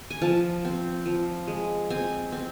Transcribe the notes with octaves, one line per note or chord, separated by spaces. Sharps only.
G#5
F3 A5
C4
F3
G#3
C4 G#5
C4